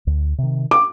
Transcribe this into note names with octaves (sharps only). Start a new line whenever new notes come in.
D2
C3 D#3
D6